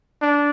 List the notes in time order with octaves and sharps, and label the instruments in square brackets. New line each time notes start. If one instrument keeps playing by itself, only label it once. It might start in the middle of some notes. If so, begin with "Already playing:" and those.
[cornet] D4